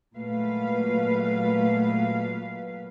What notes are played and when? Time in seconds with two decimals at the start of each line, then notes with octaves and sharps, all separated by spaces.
0.17 A#2 F#3 G#3 A3 B4 F5